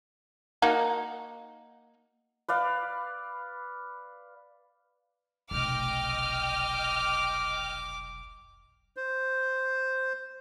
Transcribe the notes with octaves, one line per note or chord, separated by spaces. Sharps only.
A#3 D#4 F#4
B4 D5 F5
F1 B1 D#5 G5 D6 F6
C5